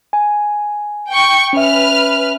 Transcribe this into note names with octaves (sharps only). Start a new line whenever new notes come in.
G#5
G5 C#6
C#4 B4 E5 F6